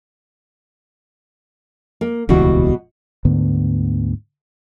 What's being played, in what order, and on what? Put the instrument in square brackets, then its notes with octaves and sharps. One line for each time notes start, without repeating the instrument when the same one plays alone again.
[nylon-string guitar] A#3
[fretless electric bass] D#1 C#2 E3 [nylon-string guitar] B2 G3 F#4
[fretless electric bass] D2 G#2 D3 B3